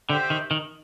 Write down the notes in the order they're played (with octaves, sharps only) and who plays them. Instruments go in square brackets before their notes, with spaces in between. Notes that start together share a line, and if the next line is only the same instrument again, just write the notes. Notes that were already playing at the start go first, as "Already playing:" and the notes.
[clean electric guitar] D3 [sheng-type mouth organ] G4 C5 E5 G5
[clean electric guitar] D#3
D#3